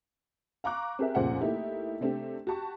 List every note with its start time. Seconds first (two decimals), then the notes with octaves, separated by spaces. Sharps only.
0.64 F5 A#5 C#6 D6 F#6
0.99 C4 G4 G#4 A#4 E5
1.15 F1 C#2 A#2 G#4 C5 F#5
1.41 A3 A#3 D#4 E4 G4
2.01 C3 A3 C4 D4 G4
2.47 F#4 G4 A5 C#6